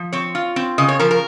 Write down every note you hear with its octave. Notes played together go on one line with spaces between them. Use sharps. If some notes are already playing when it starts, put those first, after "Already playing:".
Already playing: F3
C4 C#5
F4
C4
C#3 D#5
C#5
F3 A#4
A#4